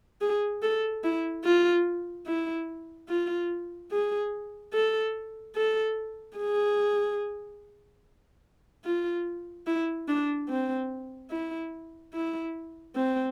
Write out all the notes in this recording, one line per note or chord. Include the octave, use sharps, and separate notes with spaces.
G#4
A4
E4
F4
E4
F4
G#4
A4
A4
G#4
F4
E4
D4
C4
E4
E4
C4